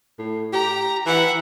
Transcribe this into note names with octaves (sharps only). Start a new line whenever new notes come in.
A2
G4 A#5
E3 E5 F#5